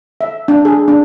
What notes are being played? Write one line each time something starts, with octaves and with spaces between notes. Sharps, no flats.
E5
D4
G#4
D4